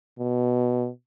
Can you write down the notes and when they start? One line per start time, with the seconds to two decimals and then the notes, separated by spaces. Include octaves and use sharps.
0.19 B2